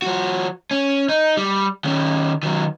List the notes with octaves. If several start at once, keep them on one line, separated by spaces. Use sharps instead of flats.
F3 F#4
C#4
D#4
G3
D#3 C#4
D#3 F#3